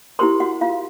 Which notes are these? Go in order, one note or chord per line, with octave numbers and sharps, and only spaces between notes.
E4 G4 A#4 C5 C6
F#4 F#5
F4 F5